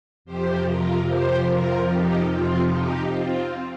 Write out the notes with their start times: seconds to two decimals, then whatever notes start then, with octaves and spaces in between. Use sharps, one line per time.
0.25 F2 C3 F3 G4 C5
0.66 F4 A#4
1.07 G4 C5
1.48 F4 A#4
1.89 D#4 G4
2.30 C4 F4
2.71 D#4 G4
3.12 C4 F4